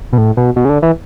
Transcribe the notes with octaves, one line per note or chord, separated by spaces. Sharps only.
B2
A2
B2
B2
C#3
D3
E3